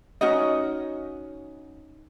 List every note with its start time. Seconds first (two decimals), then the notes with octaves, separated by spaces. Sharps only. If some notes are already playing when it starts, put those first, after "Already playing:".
0.21 C#4 D#4 F#4 D#5